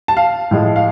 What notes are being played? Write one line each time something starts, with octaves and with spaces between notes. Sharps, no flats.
A5
F5
A2 F3 G#3
F5